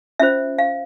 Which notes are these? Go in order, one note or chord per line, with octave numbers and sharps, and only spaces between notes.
C#4 F4 C5 E5
F5